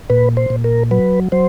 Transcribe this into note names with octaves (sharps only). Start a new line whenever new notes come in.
A#2 B4
C5
A#2
A#4
F#3 B4
F#3 C5